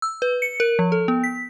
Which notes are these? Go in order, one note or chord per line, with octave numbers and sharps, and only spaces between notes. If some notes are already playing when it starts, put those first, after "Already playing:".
E6
B4
C#7
A#4
F3
A4
B3
B6